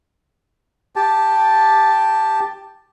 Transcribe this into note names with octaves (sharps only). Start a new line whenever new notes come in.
G4 A5